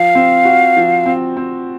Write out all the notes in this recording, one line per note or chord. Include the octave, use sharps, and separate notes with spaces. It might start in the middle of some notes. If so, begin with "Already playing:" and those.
Already playing: F3 F5
C4
F#4
F3
C4
C4